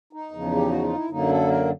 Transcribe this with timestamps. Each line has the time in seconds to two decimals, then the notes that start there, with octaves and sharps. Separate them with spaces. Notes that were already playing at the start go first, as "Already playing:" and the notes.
0.13 D#4
0.31 E2 C#3 F3
0.55 G4
0.69 F#4
0.82 F4
0.95 E4
1.09 F#2 D3 F#3 A#3 D#4
1.29 A4
1.48 A#4